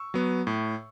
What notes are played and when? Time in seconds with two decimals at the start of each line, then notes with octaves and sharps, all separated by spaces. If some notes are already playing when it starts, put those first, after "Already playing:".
Already playing: C#6 E6
0.14 F#3 B3
0.47 A2